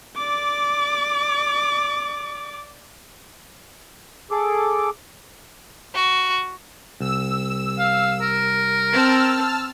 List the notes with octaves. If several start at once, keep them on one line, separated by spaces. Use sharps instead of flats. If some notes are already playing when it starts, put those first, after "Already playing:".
D5 D6
G#4 A4 D6
F#4
C2 E6
F5
A#4
C4 A5 E6 F6